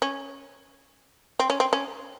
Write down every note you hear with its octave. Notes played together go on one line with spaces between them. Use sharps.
C#4
C4
C#4
C4
C#4